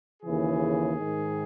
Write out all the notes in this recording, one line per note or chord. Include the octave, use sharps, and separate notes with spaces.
D#2 C#3 E3 G#4
G#2 D#3